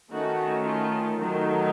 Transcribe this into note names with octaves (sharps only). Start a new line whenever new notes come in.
D#3 A3 C#4 D#4 F#4
F4
D#3 F#3 A3 D#4